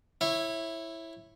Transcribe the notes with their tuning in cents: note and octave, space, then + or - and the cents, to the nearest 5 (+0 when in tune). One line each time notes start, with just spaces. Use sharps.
E4 +0 C#5 -25